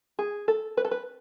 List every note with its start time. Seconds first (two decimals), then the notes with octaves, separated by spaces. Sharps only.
0.19 G#4
0.48 A4
0.77 B4
0.85 A4
0.91 B4